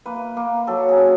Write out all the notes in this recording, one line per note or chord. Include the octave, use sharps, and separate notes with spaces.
A#3 B4
A#3
F#3 A4
G#4
C#3